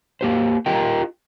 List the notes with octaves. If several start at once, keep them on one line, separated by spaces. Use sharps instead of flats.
A#3 G4 C5
F4 G4 A#4 D#5 G5